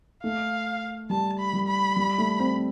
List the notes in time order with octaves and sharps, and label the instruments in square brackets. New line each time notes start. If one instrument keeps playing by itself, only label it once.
[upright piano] A3 [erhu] F5
[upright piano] G3 [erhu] A5
[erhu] B5
[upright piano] G3
[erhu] B5
[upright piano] G3
A3
C4